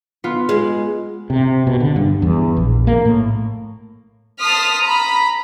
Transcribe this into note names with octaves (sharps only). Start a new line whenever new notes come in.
B3 F4
G#3
C3
B2
D3
G2
E2
A#1
A#3
A2
A5 C6 D#6 F6 B6
A#5 B5